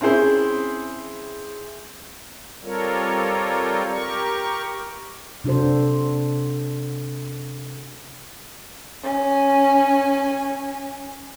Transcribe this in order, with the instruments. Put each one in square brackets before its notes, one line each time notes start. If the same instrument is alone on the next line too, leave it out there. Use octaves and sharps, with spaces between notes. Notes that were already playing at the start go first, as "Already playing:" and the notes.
[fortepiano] C4 C#4 E4 G#4 C5
[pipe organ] G3 C4 F4 A4 A#4 C#5
G4 A#4 C#6
[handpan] C3 D4 F#4 A4 C5
[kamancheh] C#4 G#5